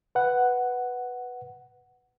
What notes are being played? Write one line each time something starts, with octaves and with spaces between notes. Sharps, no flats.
B4 F#5